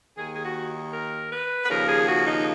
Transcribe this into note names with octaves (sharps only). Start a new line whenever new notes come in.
D#2 D#3 G#4
G#4
F#4
A#4
B4
B4
D#2 C#3 F3 A#4
G#4
F#4
D#4